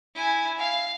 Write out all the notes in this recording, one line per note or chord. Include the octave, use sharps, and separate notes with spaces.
E4 G#5
F5